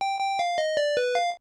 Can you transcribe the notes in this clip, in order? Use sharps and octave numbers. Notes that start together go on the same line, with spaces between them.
G5
G5
F5
D#5
D5
B4
F5